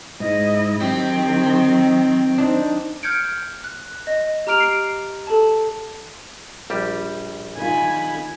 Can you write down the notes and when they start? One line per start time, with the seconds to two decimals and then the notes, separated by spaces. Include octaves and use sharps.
0.20 G#2 E4 D#5
0.81 D#3 F#3 C4 G4
2.38 D4 D#4 C5
3.03 F6 G6 G#6 C#7 D7
3.64 F#6
4.07 D#5
4.47 G4 A#5 F6 D7 F7
4.60 C7 D7
5.27 A4 A5
6.70 A#1 G3 G4
7.57 D#3 F4 G#5 B5